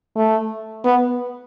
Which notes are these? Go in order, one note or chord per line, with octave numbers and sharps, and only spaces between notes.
A3
B3